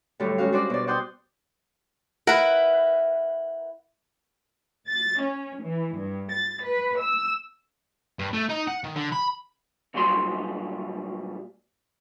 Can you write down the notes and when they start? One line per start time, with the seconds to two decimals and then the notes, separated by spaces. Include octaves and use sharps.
0.20 A2 D3 F#3 G3 A3
0.38 G#3 C#4 F#4 F5
0.52 D4 F#4 C5 D5
0.70 B2 D5
0.87 D5 F#5 G5 C6 D#6 G6
2.27 E4 A#4 B4 F#5
4.89 A6
5.23 C#4
5.63 E3
5.96 G2
6.32 A6
6.65 B4
7.01 E6
8.19 G2
8.33 A3
8.49 D#4
8.67 F#5
8.84 D#3
8.96 D3
9.12 B5
9.94 D2 A#2 F#3 G3 C6